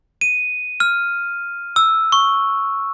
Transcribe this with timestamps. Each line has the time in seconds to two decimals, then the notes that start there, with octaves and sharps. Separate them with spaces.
0.21 D#7
0.80 F6
1.76 E6
2.12 C#6